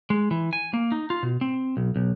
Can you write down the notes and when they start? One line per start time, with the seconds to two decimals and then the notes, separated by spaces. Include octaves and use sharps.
0.10 G#3
0.31 E3
0.53 G#5
0.74 A#3
0.92 D#4
1.10 F4
1.23 B2
1.41 C4
1.77 B1
1.96 B1